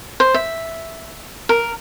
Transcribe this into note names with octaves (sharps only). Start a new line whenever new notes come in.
C5
E5
A#4